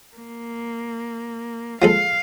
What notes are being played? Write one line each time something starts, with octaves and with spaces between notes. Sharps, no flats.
A#3
F3 G#3 A4 F5